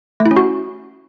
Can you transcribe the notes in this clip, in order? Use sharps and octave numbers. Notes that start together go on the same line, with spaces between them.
A3
E4
C#4
F#4